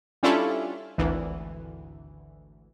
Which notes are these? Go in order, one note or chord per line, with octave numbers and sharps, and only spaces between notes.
G3 C#4 D4 E4 F4 A4
G#1 D2 E3